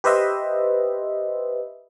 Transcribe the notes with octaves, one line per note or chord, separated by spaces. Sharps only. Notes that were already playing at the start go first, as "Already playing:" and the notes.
G4 B4 C5 D#5 E5